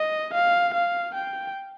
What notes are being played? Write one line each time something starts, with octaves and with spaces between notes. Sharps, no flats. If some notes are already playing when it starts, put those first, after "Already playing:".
Already playing: D#5
F5
F5
G5